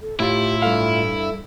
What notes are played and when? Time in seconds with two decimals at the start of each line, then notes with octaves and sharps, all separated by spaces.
0.01 A4
0.20 A2 E4 F4 G4 E5
0.62 G2 A4 F5